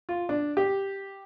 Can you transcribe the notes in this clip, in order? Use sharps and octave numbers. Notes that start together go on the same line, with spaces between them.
F4
D4
G4